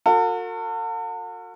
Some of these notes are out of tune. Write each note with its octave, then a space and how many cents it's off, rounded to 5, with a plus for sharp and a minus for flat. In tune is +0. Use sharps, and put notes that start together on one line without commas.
F#4 -40 A4 +45